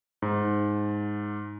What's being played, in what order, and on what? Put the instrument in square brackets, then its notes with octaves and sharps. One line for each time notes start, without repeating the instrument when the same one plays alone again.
[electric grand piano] G#2